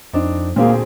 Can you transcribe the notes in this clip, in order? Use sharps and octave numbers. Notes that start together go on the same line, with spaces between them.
F2 C4 D4 D#4
D2 A#2 A#3 C4 G#4